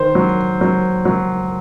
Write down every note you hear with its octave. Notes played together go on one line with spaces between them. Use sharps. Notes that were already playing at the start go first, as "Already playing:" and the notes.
Already playing: D#3 C5
F#3
F#3
F#3